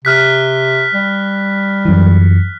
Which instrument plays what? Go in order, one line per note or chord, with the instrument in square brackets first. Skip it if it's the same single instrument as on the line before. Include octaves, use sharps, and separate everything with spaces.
[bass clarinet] C3 [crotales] F6 F#6 B6
[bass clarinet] G3
[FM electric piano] F#2 E3